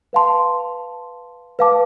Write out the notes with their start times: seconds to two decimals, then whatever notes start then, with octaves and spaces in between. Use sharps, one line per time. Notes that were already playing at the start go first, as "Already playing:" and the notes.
0.13 B4 F5 A5 C6
1.59 B4 F5 A5 D6